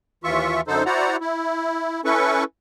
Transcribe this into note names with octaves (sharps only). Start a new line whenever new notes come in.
D#2 E3 F4 E5 C#6
F#2 D3 D#4 A4 C5
E4 F#4 C5 D5 F#5 A#5
E4
C#4 E4 A4 B4 C#6